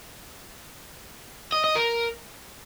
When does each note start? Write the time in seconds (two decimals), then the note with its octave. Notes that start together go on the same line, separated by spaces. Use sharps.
1.52 D#5
1.64 D#5
1.76 A#4